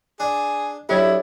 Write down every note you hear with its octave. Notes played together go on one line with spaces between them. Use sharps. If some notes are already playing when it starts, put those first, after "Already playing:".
D4 G#4
B1 D4 E4 G4 C#5 D5